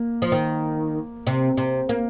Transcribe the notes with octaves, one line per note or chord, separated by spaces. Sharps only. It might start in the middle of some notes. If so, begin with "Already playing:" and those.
Already playing: A#3
F3
D#3
C3
C3
A#3